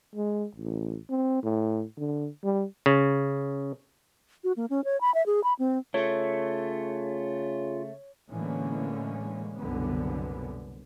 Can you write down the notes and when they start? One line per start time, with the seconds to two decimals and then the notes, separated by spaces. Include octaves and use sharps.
0.15 G#3
0.55 A1
1.10 C4
1.43 A2
1.98 D3
2.43 G3
2.86 C#3
4.44 F#4
4.57 A#3
4.70 C#4
4.85 C#5
5.01 B5
5.14 E5
5.26 G#4
5.44 B5
5.59 C4
5.94 C#3 A3 F4 C#5
8.31 A2 D3 E3 G#3 A#3 C#4
9.58 F#1 C2 F#2 B2 D3 B3